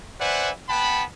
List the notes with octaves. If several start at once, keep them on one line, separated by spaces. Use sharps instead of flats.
B4 C5 D5 E5 F#5 G#5
B3 F#5 G5 A5 B5